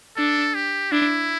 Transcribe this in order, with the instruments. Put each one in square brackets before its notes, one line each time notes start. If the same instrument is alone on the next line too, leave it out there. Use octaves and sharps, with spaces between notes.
[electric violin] D4 [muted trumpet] A4
[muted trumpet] G4
[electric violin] D4 [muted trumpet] E4